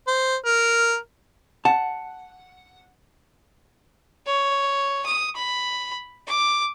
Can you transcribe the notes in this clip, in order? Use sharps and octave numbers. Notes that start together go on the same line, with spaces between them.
C5
A#4
F#5 A5
C#5
D#6
B5
D6